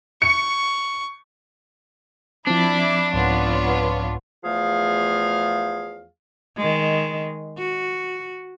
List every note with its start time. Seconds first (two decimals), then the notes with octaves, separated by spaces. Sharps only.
0.22 C#6 C#7
2.47 F3 C4 D4 E4 D6
3.14 C2 G#2 B3 F4 C#5
4.44 E2 F3 A3 G#4 F5
6.57 D#3 G#3
7.58 F#4